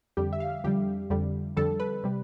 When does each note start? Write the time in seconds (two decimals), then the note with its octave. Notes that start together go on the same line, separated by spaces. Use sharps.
0.17 F2 D3 G3 G4
0.33 E5
0.40 F5
0.64 F2 D3 G3 G4
1.10 F2 D3 G3
1.57 F2 D3 G3 A4
1.80 B4
2.04 C3 G3